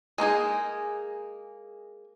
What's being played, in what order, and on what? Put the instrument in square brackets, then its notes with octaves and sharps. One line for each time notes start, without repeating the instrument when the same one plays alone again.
[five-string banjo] G#3 A#3 D#4 G#4